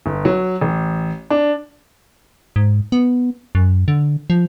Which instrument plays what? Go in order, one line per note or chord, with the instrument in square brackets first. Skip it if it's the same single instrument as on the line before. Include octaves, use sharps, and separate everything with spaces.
[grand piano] G1
F#3
A1
D4
[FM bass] G#2
B3
F#2
D3
F3